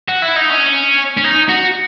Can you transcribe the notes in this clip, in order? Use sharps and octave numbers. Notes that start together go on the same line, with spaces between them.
F#4
E4
D#4
C#4
C#4
D#4
F#4